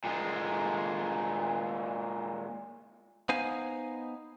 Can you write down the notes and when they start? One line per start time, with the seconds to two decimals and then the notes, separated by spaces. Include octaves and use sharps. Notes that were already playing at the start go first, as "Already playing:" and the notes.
0.05 A#2 G#3
3.29 B3 D#4 C5 F5 G#5